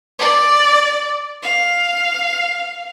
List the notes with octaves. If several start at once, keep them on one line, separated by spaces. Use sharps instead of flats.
D5
F5